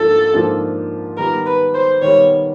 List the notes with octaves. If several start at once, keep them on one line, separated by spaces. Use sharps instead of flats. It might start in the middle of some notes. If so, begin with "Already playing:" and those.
Already playing: G#2 F3 A#3 D4 F4 A4
G#2 F3 A#3 D4 F4
D#3 G3 B3 A#4
B4
C5
D#3 G3 B3 C#5